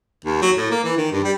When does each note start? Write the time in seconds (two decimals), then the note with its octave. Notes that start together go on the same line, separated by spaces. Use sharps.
0.24 D#2
0.42 F#3
0.56 A2
0.71 A#3
0.84 E3
0.97 D#3
1.12 G2
1.24 G3